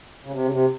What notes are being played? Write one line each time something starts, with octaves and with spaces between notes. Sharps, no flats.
C#3
C3
C#3
C3